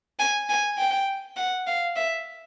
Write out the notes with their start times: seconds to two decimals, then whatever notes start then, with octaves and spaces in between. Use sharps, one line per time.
0.19 G#5
0.49 G#5
0.78 G5
1.36 F#5
1.67 F5
1.96 E5